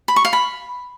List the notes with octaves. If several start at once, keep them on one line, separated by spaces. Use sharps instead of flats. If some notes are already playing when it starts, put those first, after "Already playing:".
B5
C#6
F5
B5